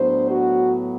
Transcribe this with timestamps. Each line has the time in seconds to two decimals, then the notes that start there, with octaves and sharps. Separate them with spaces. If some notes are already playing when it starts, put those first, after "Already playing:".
Already playing: A2 F#3 B3 D4 C5
0.28 F#4